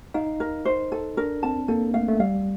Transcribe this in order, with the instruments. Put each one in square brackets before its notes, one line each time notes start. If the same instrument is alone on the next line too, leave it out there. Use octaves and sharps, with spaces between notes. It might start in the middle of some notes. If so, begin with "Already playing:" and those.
[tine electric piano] D#4 [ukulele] F5
[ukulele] A#4
C5
A4
[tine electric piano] D4 [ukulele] A#4
[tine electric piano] C4 [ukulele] A5
[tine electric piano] A#3 [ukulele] A4
[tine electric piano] A3 [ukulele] F5
[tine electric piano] A3
[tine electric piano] G3 [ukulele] F5